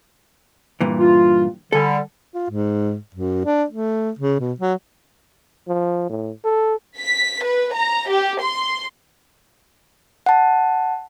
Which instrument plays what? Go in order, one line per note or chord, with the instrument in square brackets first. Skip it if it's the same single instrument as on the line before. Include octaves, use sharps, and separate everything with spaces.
[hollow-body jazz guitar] G2 A#2 E3
[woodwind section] F4
[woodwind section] D3 G3 [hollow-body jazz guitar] A4 G#5
[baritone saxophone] F4
G#2
F#2
D4
A3
C#3
B2
F#3
[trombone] F3
A2
A4
[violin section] B6
B4
A#5
G4
C6
[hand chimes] F#5 A5